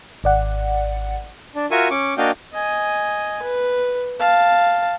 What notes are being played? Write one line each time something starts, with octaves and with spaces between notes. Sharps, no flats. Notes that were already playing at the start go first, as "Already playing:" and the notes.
G#1 D5 F#5
D4
F4 F#4 A#4 E5 G#5 C#6
C#4 C#6 D6
A#3 D4 F#4 D#5 F5 G5
D#5 G#5
B4
F5 A5